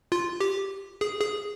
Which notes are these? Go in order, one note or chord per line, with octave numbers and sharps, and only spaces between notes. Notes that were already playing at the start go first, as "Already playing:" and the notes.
F4
G4
G#4
G#4